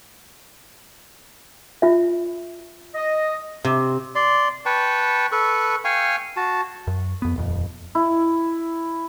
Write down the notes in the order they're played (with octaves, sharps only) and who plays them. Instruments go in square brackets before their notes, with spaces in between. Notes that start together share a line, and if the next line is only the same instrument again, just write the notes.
[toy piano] F4 E5
[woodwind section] D#5
[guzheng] C3
[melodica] D5 C6
B4 G5 A5 C#6
A4 B4 C#6
F5 G5 G#5 C#6
F#4 A5
[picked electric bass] F#2
F2 B3
D#1 F2
[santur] E4